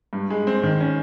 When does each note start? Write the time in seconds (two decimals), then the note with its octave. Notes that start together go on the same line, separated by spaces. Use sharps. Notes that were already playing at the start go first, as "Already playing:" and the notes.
0.13 G2
0.30 G#3
0.47 C4
0.63 D#3
0.80 C#4